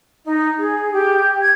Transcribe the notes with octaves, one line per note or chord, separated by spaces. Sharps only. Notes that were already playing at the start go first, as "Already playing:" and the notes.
D#4
G#4
G4
G#6